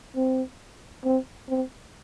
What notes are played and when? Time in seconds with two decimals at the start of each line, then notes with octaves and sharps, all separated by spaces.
0.16 C4
1.04 C4
1.49 C4